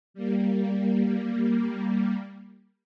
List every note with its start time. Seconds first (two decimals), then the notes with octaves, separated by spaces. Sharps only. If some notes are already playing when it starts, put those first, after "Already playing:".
0.14 G3 A#3